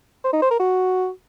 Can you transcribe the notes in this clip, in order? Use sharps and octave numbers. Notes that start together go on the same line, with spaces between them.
C5
D#4
C5
A#4
F#4